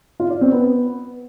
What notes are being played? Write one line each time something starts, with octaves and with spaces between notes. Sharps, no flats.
F4
D5
C4
B3